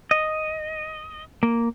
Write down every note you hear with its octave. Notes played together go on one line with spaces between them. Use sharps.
D#5
A#3